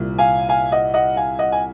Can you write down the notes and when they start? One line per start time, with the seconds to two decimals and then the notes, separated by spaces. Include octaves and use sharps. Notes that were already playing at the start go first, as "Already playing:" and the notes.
Already playing: C2 A#2
0.18 F5 G#5
0.49 F5 G#5
0.72 D#5 F#5
0.94 D#5 F#5
1.16 F5 G#5
1.39 D#5 F#5
1.52 G#5